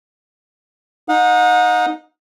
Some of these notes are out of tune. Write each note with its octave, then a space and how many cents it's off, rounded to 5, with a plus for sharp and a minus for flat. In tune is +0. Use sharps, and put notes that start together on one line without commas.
D#4 +0 F#5 -40